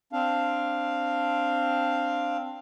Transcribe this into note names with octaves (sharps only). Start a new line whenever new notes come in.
C4 D4 F5